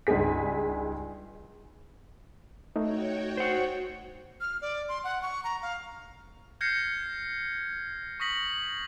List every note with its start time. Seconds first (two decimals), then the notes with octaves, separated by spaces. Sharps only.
0.07 C#2 G2 D#4 G#4 B6
2.76 A3 D#4 F#4 C#5 G5
3.37 C5 F#5
4.41 F6
4.62 D5
4.88 C6
5.04 F#5
5.22 C#6
5.44 A#5
5.62 F5
6.61 F6 G6 G#6 A#6 C7 C#7
8.20 C#6 D#6 A#6 B6 F#7